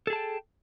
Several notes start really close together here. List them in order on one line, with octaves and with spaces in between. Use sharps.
A4 G#4 A5 G5